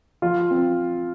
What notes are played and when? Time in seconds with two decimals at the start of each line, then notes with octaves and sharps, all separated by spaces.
0.22 F3 F4
0.51 C4